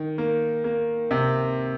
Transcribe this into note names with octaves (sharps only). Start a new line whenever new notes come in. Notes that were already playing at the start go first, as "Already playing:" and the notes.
Already playing: D#3
A#3
A#3
C3